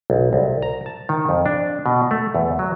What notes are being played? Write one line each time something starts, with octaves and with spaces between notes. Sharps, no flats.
B1
C2
A#5
A5
D#3
F2
D4
B2
A3
E2
F#3